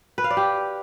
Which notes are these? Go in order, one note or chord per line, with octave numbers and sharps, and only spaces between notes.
B4
F5
D5
G4